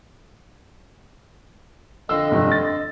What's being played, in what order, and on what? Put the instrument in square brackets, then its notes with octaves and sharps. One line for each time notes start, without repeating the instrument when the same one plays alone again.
[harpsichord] F2 D3 C4 [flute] D#5 [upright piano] E6
[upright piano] F1 G2
A6